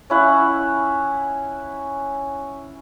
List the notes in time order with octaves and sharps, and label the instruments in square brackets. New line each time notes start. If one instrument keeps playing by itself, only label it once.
[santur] C#4 E4 F#5